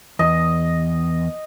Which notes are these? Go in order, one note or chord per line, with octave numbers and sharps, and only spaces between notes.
E2 D#5